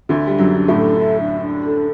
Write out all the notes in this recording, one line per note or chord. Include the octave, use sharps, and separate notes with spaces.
D2 D3 E5
G3 D4
F#2 F#3
D4
A2 A3
A4
E5
D4
D4
A4